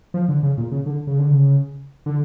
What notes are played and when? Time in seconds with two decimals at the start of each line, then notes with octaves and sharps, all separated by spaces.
0.14 F3
0.29 D3
0.43 C#3
0.58 A#2
0.72 C#3
0.86 D3
1.07 C#3
1.19 D3
1.30 C#3
2.06 D3